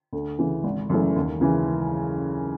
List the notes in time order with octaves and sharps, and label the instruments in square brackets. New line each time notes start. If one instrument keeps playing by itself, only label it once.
[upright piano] D2
C#3 E3
G#1
F#2 C#3 E3 A3
D#2
C#3 E3